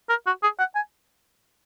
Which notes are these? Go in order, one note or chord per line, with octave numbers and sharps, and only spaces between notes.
A#4
F#4
G#4
F#5
G#5